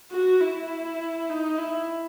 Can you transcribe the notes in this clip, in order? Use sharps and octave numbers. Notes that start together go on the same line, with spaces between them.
F#4
E4
D#4
E4